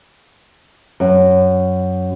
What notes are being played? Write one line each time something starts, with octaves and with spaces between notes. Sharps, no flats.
F#2